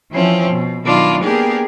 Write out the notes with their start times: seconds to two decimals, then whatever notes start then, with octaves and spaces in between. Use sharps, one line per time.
0.11 E3 F3 C4 C#4
0.50 B2
0.84 B2 D#3 F#3 D4 E4 F4
1.22 A#3 B3 D4 G4 G#4 A#4